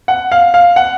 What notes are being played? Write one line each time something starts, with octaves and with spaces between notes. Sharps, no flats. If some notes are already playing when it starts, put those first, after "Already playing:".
F#5
F5
F5
F#5